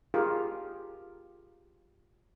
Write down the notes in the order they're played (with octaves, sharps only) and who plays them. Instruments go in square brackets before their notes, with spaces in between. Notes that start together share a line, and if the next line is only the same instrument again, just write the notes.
[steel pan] F4 G4 G#4 A#4 F5